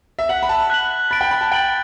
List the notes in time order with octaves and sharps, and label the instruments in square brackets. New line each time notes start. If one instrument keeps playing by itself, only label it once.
[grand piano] E5
[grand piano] F#5 [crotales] F#6 B6 F#7
[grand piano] B5
A5
[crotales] F#6 B6 F#7
[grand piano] B5 [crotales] A6 D7 F#7
[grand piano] G5
B5
A5
[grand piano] G5 [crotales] A6 D7 F#7